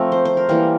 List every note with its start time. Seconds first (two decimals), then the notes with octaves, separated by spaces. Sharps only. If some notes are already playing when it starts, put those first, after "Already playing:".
Already playing: F3 A3 C4 A#4
0.12 C5
0.25 C5
0.37 A#4
0.49 E3 G3 A#3